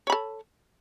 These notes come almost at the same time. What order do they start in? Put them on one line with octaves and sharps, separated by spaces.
C#5 B5 A4